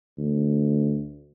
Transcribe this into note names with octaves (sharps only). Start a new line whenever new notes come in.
D2